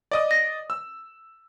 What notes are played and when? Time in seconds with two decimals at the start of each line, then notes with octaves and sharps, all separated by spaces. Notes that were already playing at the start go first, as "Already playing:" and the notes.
0.11 D5 D#5 D#6
0.31 A#6
0.70 E6